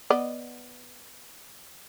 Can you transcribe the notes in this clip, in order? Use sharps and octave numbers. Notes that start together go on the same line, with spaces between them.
B3 D5 D#5